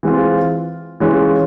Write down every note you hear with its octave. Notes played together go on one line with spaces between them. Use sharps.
E3 G#3 C4 F4
E3 G#3 C#4 F4